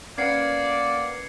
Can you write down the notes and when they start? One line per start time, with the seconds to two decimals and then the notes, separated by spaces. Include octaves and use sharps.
0.18 A#3 C#4 B4 D5 F#5 G#6 C7 C#7